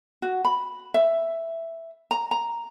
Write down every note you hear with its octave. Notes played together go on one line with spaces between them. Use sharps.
F#4
B5
E5
A#5
A#5